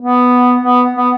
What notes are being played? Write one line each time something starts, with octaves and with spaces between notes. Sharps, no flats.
B3
B3
B3